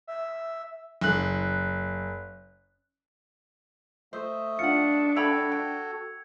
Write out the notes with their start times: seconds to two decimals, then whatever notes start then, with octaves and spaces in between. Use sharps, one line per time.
0.07 E5
1.01 F#1 F#6
4.13 A3 C5 D#5 E5
4.59 D4 F4 F#5 C#7
5.16 F#4 A4 E5 G5 B5 E6 G#6 F7
5.52 G5